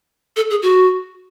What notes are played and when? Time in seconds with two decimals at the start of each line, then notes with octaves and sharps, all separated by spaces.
0.36 A4
0.50 G#4
0.62 F#4